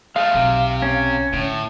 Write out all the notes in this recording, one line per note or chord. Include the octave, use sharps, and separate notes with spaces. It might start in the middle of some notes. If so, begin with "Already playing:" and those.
G#3 A3 F5
B1 C3
C#4
A2 D3